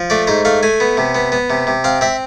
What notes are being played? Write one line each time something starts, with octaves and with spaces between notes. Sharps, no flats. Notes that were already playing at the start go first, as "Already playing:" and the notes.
Already playing: F3
A3 D5
G#2 C5
A3 F5
A3 G#5
B3
C3
B3
B3
C3
C3
C4 F5
C4 E5